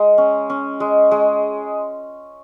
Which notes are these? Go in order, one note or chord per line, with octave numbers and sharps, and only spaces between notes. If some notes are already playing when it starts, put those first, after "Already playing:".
Already playing: G#3
C#4
C#4
G#3
G#3